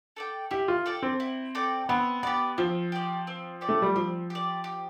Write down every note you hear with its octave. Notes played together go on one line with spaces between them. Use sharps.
A4 D5 G5
E4 G4
F4
A4 D5 G5
C4
E4
A4 D5 G5
B3 C4
B3 G4 D5
F3 C4
G4 D5
C4
G4 D5
A3
G3
F3 C4
G4 D5
G4